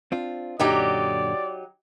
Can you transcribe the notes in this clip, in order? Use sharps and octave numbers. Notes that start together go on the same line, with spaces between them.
C4 D4 F4
F#2 A#2 D3 F#3 D#4 G4 D5